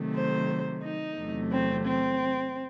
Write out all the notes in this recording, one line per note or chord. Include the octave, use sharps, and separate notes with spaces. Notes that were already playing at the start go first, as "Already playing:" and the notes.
Already playing: C3 D#3 F#3 A3
C5
D#4
E2 C3 F#3 A3
C4
C4